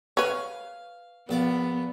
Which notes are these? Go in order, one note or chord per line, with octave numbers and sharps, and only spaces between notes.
B4 C#5 F5
A#1 B3 D5